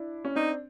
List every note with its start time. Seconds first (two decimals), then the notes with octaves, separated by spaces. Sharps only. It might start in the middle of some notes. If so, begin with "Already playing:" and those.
Already playing: D4 E4
0.25 C#4
0.35 C4 D4 D#4